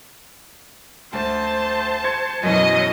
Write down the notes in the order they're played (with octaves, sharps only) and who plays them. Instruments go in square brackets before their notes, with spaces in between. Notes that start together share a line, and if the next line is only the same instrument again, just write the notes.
[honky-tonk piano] D2 A6 [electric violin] C5 A5
[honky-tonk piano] C6 G#6 C#7
[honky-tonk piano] F#2 B2 E3 [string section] F#3 D#5